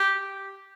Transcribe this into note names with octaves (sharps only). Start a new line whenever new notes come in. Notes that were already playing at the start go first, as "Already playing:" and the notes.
Already playing: G4